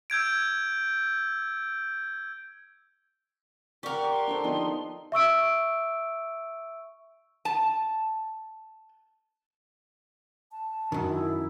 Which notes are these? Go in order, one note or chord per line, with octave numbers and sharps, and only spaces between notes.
E6 G6 G#6 D7
G4 A#4 D5 F#5 C#6
C6
D4 A4 C5
F3 B3 D#4
E5 C#6 E6 D7
A5
A5
F#2 D#3
E4